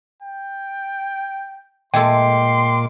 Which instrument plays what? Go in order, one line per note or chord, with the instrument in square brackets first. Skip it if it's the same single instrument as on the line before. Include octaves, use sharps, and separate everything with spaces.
[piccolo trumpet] G5
[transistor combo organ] A#2 D6 [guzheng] G#3 A3 A4 [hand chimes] G5 [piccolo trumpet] C6